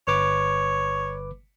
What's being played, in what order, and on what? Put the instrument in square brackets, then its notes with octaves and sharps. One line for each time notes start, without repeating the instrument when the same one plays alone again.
[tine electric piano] G1 B4 D6 [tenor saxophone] C#5